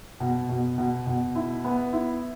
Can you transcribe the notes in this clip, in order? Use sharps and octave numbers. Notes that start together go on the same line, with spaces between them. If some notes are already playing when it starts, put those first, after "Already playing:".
B2
B2
B2
B2
E4
B3
E4